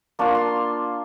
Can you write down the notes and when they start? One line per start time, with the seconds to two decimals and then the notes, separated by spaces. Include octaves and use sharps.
0.19 A#3 D4 F4 C#6
0.35 C6